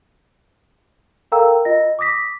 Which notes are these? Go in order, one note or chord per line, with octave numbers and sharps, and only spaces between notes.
A4 A#4 F5 G5 A#5 E6
F4 D#5 A#6
D6 D#6 A#6 B6